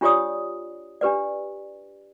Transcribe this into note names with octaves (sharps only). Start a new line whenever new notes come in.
D4 F4 G4 C#5 D5 D#6
D4 G4 B4 D5